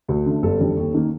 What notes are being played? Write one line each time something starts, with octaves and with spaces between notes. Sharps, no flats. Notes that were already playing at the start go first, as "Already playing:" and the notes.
D2
D3 A3
G1 A4
F2 D3 G3
D#2
D#3 A#3